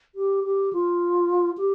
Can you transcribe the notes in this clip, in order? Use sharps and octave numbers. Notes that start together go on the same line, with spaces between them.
G4
G4
F4
G4